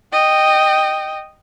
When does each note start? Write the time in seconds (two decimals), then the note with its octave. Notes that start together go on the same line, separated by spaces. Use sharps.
0.13 D#5 G5